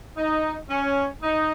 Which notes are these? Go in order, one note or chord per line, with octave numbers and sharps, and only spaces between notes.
D#4
C#4
D#4